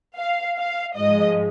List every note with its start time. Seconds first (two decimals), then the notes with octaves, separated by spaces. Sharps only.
0.17 F5
0.57 F5
0.97 G#2 F3 G#3 D#5